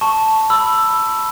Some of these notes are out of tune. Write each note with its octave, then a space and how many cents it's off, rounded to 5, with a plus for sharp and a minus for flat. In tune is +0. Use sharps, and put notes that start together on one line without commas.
A5 +0 C#6 +0
B5 +0 E6 +10